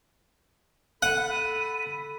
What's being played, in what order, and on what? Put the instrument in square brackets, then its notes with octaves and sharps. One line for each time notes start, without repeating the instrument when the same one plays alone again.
[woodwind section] A4 B5 [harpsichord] F#5 [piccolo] D#7